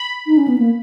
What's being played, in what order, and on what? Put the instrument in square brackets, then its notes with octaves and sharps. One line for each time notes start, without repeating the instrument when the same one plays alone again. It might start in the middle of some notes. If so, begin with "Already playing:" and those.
Already playing: [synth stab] B5
[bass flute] D#4
C#4
B3
A#3